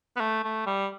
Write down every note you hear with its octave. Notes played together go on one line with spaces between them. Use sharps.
B3
A3
A3
G3